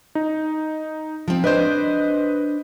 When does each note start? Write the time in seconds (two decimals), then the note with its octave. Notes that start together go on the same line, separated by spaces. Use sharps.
0.15 D#4
1.28 F3 C4
1.44 D4 B4 C5 D#5 G6